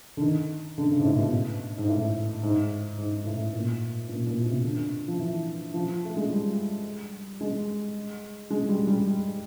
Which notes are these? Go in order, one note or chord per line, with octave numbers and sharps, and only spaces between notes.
D3
D#3
D3
C#3
G#2
A2
B2
G#2
A2
G#2
G#2
A2
A#2
A#2
A#2
B2
C3
D3
F3
E3
F3
A3
G#3
G3
G#3
G#3
G3
G3